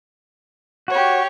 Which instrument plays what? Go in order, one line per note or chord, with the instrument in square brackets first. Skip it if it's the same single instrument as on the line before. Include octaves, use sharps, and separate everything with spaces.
[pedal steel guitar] F#4 [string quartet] G4 C#5